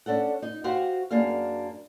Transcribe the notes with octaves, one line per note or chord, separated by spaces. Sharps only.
C#4 D4 A4 F#5
D#4
F#4 G4 C5 F5 F#5
F#2 A#3 D4 G#4 F5